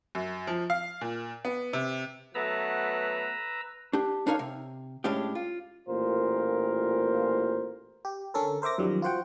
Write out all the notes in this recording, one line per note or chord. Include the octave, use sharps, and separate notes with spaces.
F#2
F3
F5
A#2
B3
C3
F#3 A3 B3 B4 A#5 E6
D4 G4
D4 D#4 A#4 C#5 F5
C3
A2 G#3 C#4 D4 G4
F4
A1 A#2 F4 A#4 C5
G4
D3 C#4 A4 A#4
A#4 C5 E5 D6 A#6
F#2 D#3 F3 G3
F4 F#4 C5 F#5 G5